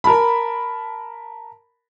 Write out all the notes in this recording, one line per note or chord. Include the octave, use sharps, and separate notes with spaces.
A#4 A5 B5